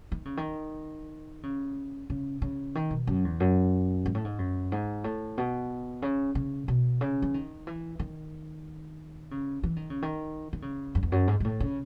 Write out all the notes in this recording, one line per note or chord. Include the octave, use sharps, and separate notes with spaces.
D#3
C#3
D#3
C#3
C#3
C#3
D#3
B2
F#2
E2
F#2
G#2
A2
G#2
F#2
G#2
A2
B2
C#3
C#3
B2
C#3
E3
D#3
E3
D#3
C#3
E3
D#3
C#3
D#3
D#3
C#3
F#2
E2
F#2
G#2
G#2
A2
C#3